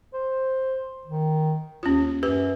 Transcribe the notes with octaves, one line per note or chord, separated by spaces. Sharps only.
C5
D#3
D#2 C#4 F4
F#2 G4 B4